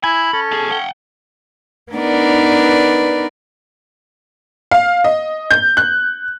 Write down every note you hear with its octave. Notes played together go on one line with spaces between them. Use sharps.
E4 G#5 B5
C#4 A4
B2 G#4
F#5 G5
B3 D4 D#4 A#4 B4 D5
F5
D#5
G6
F#6